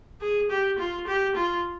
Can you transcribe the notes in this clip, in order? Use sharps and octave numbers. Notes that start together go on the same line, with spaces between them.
G#4
G4
F4
G4
F4